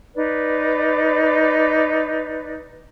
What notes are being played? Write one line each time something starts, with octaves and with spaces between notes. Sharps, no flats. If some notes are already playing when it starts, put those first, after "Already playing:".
D#4 B4 D5